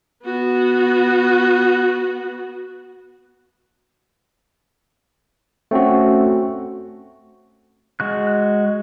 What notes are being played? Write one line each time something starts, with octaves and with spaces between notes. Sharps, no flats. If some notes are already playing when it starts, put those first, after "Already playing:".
B3 F#4
A3 C4 C#4 F#4
G#3 F#4 F#6